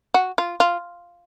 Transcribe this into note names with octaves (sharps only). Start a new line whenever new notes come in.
F#4
F4
F4